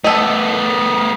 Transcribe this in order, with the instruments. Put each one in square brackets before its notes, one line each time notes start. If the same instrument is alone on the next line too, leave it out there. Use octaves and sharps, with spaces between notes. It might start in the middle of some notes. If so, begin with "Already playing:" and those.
[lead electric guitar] A3 B3 [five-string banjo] A4 D#5